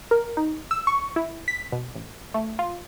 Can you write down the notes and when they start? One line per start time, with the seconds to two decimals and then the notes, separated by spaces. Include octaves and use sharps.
0.11 A#4
0.37 D#4
0.71 E6
0.87 C#6
1.16 E4
1.48 B6
1.72 B2
1.95 A1
2.34 A3
2.59 F4